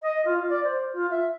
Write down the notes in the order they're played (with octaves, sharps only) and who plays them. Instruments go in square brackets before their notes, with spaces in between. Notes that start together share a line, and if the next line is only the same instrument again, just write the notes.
[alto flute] D#5
F4
D5
C5
F4
E5